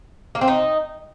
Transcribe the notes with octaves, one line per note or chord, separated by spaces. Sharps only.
A#3
C4
D#4